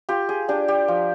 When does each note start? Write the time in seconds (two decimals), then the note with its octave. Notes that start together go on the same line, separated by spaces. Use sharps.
0.09 F4 G4
0.29 G#4
0.48 D4 G4
0.68 G4
0.88 F3